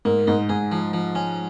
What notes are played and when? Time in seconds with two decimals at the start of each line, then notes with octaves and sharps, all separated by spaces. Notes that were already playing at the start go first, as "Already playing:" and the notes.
0.05 G#2 A#3
0.27 G#2 D#4
0.49 G#2 G#4
0.72 F3
0.93 F3
1.15 C#4